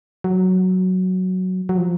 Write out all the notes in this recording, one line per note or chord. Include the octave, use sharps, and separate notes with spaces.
F#3
F#3
F3